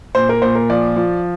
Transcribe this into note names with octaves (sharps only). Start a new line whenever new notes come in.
A#2 C5
A#4
A#2 C5
A#4
F3 D5
F3